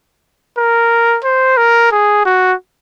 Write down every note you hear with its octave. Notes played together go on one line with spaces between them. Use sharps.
A#4
C5
A#4
G#4
F#4